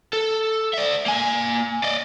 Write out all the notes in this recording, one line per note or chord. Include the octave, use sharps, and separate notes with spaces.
A4
D5 E5
A#3 G#5
D5 D#5